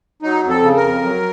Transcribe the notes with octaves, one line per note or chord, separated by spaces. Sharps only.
F#3 D#4
F2
A4
C#3
A#4
F2
F#3